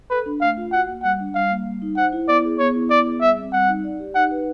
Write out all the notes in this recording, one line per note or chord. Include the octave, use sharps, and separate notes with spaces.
A4 B4
D4
A3 F5
F4
F#4 F#5
A#3
G3 F#5
D4
G3 F5
A#3
G3
D#4
C5 F#5
E4
B3 D5
G#4
B3 C#5
E4
B3 D5
G#4
G3 E5
C4
G3 F#5
D#4
D5
G4
D#4 F#5
B4